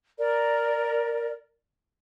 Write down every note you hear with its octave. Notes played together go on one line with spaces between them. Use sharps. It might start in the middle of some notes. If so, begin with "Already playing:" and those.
A#4 D5